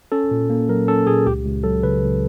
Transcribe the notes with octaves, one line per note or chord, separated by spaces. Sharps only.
C#4 A4
A#2
A#3
F#3 A#4
C#4 A4
A#2 G#4
C#2 G4
C#2
F#3 A4
C#3 B4
C#2